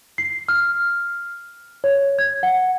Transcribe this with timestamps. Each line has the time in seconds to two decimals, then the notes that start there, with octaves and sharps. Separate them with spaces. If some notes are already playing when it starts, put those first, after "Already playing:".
0.18 C7
0.49 F6
1.84 C#5
2.19 G#6
2.43 F#5